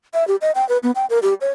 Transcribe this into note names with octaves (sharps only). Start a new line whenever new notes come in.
E5
G4
D#5
G5
B4
B3
G5
A#4
G4
C#5